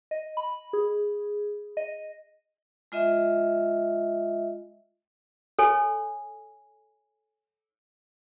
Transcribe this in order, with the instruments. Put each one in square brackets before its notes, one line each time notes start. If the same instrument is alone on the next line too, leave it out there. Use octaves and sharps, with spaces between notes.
[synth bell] D#5
B5
G#4
D#5
[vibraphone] G#3 F4 D#5 E5
[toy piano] A4 C#5 G#5